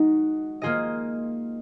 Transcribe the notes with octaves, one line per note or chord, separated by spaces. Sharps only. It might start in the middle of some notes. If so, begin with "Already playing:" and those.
Already playing: G#3 D#4 F#4
A#3 F4 G#4 D#5